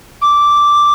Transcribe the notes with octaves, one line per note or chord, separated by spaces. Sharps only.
D6